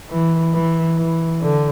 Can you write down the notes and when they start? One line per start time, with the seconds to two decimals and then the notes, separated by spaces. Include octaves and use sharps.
0.10 E3
0.53 E3
0.98 E3
1.41 D3